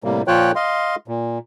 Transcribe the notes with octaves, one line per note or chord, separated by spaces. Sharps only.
A2 C3 G3 A#3
A#2 F3 F4 C#5 G5 F#6
D#5 F5 C6
A#2